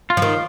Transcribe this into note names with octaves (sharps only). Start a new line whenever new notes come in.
F4
F3
D#3